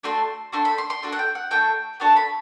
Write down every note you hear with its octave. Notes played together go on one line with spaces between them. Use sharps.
A3 D4 F#4 A4 C6
A3 D4 F#4 A4 C6
B5
C6
C6
A3 D4 F#4 A4
F#5
G5
F#5
A3 D4 F#4 A4 G5
B3 D4 F#4 A4 A5
B5